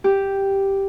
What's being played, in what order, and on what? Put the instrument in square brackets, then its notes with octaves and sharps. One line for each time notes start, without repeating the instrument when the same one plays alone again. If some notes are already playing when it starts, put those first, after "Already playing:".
[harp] G4